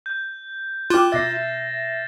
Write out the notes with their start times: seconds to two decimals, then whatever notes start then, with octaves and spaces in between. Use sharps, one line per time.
0.06 G6
0.90 F4 G5 D6 F6 F#6 E7
1.12 B2 E5 A6 A#6 C7